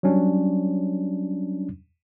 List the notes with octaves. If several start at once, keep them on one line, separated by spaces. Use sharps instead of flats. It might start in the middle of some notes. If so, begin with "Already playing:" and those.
F#3 G3 C#4 D4